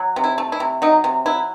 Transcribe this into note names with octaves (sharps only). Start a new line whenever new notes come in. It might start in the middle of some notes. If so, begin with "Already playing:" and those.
Already playing: F#3
C3
E4
A3
E4
C3
F#3 D#4
C3
F#3 E4